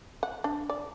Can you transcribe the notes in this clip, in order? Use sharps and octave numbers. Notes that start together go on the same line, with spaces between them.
F#5
D4
D5